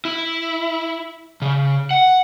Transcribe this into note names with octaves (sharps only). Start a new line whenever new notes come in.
E4
C#3
F#5